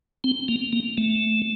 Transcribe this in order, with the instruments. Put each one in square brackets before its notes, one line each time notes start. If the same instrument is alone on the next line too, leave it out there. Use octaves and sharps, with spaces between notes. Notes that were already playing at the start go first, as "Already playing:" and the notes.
[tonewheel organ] C4
A#3
A#3
A3